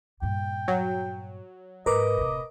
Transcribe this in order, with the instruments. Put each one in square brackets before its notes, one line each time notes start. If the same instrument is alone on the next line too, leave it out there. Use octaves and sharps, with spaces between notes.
[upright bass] G2 A#2 [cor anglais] G5
[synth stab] F#3
[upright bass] G#2 [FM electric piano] A#4 B4 D6 [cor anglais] D#5
[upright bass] D1 C3